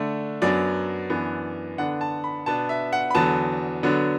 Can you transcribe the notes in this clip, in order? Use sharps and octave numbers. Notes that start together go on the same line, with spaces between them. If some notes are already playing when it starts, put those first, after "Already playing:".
Already playing: D3 A3 D4
F#2 F#3 B3 D4 D5
F#2 E3 B3 D4
D3 B3 D4 F#5
A5
B5
B2 B3 D4 A5
E5
F#5
B5
E2 D3 F#3 B3 A5
D3 F#3 B3 D4